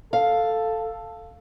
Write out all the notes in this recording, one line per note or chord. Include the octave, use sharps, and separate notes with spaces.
A4 F5